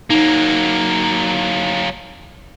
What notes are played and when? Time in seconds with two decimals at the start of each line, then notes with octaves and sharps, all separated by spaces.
0.10 F#3 A#3 D#4